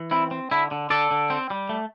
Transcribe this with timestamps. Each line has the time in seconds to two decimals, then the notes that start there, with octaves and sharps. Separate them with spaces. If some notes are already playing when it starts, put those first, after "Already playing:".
Already playing: E3
0.11 C4 E4
0.31 C4
0.51 D3 E4
0.71 D3
0.90 D3 A4 D5
1.11 D3
1.30 C4
1.50 G3
1.69 A3